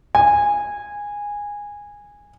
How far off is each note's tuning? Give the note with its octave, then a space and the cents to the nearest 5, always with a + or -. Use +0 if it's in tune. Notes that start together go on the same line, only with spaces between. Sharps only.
G#5 -15